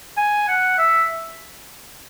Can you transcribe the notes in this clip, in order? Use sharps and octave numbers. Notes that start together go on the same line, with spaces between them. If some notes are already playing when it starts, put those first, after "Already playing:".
G#5
F#5
E5